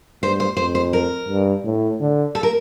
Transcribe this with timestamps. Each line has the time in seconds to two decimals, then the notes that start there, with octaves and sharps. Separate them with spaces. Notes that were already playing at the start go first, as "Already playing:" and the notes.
0.22 G2 C5
0.40 C5
0.57 F2 C5
0.75 C5
0.93 A#4
1.29 G2
1.64 A2
2.00 D3
2.35 A4
2.43 A#4